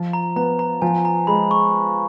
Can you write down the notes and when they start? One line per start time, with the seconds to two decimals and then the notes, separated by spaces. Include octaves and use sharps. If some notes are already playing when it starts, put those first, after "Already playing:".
Already playing: F3 F4
0.13 A#5
0.36 B3 A#5
0.59 A#5
0.82 F3 G#5
1.05 A#5
1.27 G#3 B5
1.51 C#6